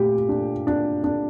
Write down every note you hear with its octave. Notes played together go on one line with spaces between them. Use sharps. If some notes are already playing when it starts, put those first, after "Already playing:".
Already playing: A#2 A3 G4
D4
D4
D4